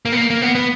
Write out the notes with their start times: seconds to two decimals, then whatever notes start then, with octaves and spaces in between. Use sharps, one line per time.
0.05 A#3
0.12 B3
0.17 A#3
0.30 A#3
0.42 B3
0.55 B3